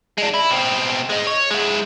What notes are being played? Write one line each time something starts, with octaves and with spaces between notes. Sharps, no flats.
G#3 D4
E4
B2 C4
G#3 D#4
C#5
G#3 E4